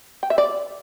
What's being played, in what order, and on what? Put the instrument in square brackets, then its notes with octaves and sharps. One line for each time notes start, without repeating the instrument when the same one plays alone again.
[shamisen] G5
E5
D5